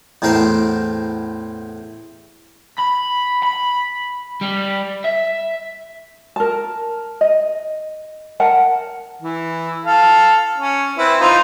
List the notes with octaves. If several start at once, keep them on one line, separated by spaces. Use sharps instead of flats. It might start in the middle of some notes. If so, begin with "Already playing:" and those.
E2 A2 C4 A#4 C5 G5
B5
B5
G3
E5
A#4 A5
D#5
A#4 F#5 A5
E3
A4 F5
C#4
C4 E4 B4
D#4 F4 C5